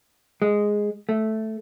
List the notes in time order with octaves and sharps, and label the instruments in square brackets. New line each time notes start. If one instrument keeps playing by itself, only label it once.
[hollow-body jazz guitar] G#3
A3